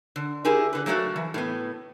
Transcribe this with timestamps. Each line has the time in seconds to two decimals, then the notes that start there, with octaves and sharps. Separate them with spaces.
0.16 D3
0.45 E4 G4 G#4 A#4
0.73 D3 B4
0.86 F#3 A3 A#3 F#4 A4
1.16 E3
1.34 A2 B3